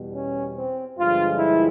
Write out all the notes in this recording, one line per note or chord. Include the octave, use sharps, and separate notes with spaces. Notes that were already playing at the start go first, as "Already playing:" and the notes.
Already playing: E2 B2 G3
C#4
C4
G2 D3 F3 G#3 F4
E4